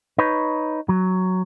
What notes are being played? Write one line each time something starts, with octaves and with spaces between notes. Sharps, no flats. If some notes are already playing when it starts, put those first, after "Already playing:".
D#4 B4 C#5
F#3